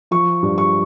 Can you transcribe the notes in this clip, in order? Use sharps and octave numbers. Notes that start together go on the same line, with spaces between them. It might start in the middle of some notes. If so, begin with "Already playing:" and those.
F3 C#6
G2
C#6